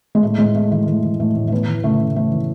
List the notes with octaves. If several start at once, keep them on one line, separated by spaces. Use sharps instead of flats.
G#3
A2 A3
A2 G#3
A2 A3
E3 A3
E3 A3
E3
A2 A3
A2
A3
E3 B3
E3
C#3 A3
C#3
E3 A3
E3